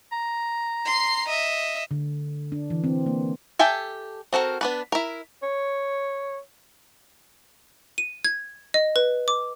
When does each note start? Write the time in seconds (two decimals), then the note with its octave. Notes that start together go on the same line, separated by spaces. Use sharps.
0.12 A#5
0.85 C6 C7
1.28 D#5 E5
1.91 D3
2.52 D4
2.70 E3
2.84 C4
3.06 A#3
3.59 G4 A4 E5 G5 G#5
4.33 C4 F#4 A4 A#4
4.61 B3 D4 B4
4.92 E4 A#4
5.43 C#5
7.98 D#7
8.25 G#6
8.74 D#5
8.96 B4
9.28 D6